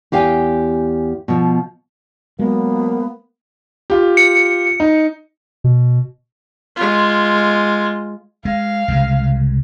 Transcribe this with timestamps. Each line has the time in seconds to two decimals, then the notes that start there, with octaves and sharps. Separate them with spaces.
0.12 E2 G4 F5 G5 G#5
1.28 B2 F3
2.39 F#3 G#3 A#3 B3
3.90 F4 G4
4.17 C#7
4.80 D#4
5.64 B2
6.76 G#3 F4
8.45 G#3 F5
8.88 C2 C#3 G#3